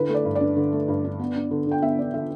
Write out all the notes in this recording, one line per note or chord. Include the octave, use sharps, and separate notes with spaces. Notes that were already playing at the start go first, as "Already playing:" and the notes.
Already playing: D3 E4 B4
A3
D5
G2
D4 D5
D3
A3
G2
D4
B3
D4
D3
D3 G5
B3 E5
D4 D5
D3 E5